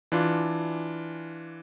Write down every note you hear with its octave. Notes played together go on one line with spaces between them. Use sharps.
E3 D4 F4